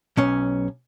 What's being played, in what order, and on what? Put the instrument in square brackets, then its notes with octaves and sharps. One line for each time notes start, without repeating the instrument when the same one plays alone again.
[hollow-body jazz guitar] B1 C#4